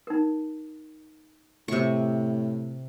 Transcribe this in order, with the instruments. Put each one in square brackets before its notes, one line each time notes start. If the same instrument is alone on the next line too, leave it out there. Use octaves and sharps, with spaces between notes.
[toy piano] D#4 A#4
[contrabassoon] A2 [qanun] C3 C#6